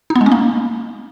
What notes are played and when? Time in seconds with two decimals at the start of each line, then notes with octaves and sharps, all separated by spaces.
0.10 D#4
0.16 B3
0.21 G#3
0.26 C#4
0.32 A#3